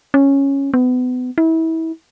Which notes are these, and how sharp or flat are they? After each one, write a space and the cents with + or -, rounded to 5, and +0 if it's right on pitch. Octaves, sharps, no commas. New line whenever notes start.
C#4 -5
B3 +30
E4 -30